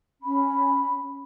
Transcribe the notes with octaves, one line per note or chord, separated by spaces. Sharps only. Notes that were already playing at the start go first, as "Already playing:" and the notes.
C#4 B5